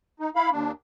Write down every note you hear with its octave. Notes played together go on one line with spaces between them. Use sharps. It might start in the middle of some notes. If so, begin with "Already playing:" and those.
D#4
E4 F5 B5
D#2 D4